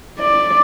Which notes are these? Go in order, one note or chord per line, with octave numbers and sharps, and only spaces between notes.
D5